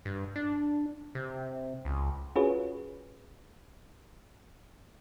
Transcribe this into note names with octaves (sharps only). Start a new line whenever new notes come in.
G2
D4
C3
C#2
C#4 F4 F#4 G#4 B4 C#5